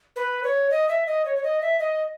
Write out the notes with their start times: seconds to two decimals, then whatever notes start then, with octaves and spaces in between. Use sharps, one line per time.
0.16 B4
0.43 C#5
0.70 D#5
0.89 E5
1.07 D#5
1.25 C#5
1.36 C#5
1.43 D#5
1.61 E5
1.79 D#5